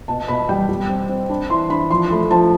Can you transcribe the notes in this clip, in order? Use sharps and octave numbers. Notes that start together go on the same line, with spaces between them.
B2 A5
B2 B5
G3 G5
G3
C4
C4
D4 B5
E3 C6
D4 B5
F3 C6
A3 B5
F3 A5